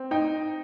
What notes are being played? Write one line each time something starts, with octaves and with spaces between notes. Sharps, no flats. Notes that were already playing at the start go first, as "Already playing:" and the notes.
Already playing: C4
D#4 G5